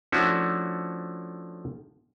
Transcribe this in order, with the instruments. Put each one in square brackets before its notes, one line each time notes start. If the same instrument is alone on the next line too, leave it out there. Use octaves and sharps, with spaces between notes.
[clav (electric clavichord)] F3 A3 C#4 D4 E4 F#4